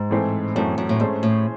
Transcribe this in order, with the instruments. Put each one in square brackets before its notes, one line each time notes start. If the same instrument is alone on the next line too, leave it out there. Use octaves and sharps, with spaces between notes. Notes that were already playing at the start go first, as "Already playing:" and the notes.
Already playing: [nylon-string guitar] G#2
[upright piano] A2 E3 A3 C4
[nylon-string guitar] F#2 [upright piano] A2 E3 A3 C4
[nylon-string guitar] F#2
A2
[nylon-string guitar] G#2 [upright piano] A3 C#4 G#4 C5
[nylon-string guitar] A2